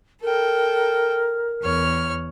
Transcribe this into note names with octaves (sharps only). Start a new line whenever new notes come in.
A4 A#4 G5
E2 C#5 F6